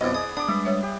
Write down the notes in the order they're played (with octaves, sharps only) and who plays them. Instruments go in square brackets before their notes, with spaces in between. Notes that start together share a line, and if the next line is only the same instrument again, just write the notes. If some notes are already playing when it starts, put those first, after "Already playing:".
[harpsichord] B1 F2 [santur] B3 E4 D5 [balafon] C5 [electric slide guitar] D#5
[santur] G#4 [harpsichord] D#6
[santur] B3 D6 [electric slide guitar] D4 [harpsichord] D#6
[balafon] G3 [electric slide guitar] G#3 D4 B4
[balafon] G3 C#5 E5
[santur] G4